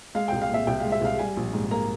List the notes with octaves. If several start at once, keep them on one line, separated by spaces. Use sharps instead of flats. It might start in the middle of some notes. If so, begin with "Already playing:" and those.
G#3 F5
C2 G5
F5
A#2 E5
C2 G5
G#3 F5
E5
C2 F5
G3 G#5
A#1
G#2
A#3 A#5